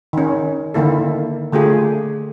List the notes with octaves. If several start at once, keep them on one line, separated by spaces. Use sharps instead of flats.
D#3 C#4
D3 D#3 A#3 E4 A4
D3 A3 F4 G4 G#4